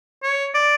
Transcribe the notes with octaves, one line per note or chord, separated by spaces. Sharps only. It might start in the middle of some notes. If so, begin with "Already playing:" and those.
C#5
D5